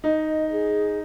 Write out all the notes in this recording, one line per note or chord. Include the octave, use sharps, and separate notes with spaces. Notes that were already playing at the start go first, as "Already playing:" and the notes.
D#4 D#5
G#4